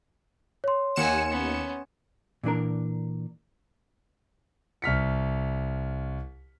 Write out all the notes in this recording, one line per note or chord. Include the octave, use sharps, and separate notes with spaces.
C#5 C6
D#2 F#5 G#5 C#7 E7
B3 C#4
A#2 E3 D4 A#4
C2 F6 B6 C#7